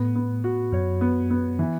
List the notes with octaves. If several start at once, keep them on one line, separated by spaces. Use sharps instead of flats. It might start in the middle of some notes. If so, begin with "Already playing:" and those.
Already playing: A2 B3
B3
F#4
F#2 C#5
B3
B3
E3